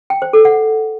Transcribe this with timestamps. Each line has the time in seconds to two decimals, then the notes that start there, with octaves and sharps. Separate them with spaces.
0.10 G5
0.22 C5
0.33 A4
0.45 F#5